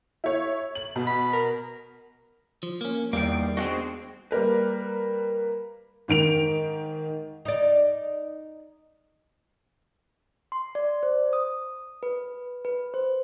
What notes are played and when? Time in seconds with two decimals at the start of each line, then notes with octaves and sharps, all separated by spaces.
0.24 E4 C#5
0.75 F#7
0.96 B2
1.07 B5
1.33 A#4
2.63 F3
2.81 A#3 C#4
3.13 E2 D#3 G3 A#3 G5 C7
3.57 G#3 B3 C4 D4 F#4 D#5 F5 G5
4.31 G3 A#3 A#4 B4
6.08 G#2 D#3 D7 F7
7.45 D#4 D5
10.52 C6
10.75 D5
11.03 C5
11.33 D#6
12.03 B4
12.65 B4
12.94 C5